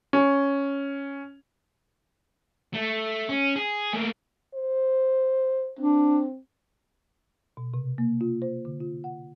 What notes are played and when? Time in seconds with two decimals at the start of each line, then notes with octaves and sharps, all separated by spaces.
0.13 C#4
2.74 A3
3.29 C#4
3.56 G#4
3.93 A3 A#3
4.55 C5
5.79 C4 D4
7.57 B2
7.74 C3
7.98 A#3
8.21 F4
8.42 C5
8.65 D3
8.80 F4
9.04 F#5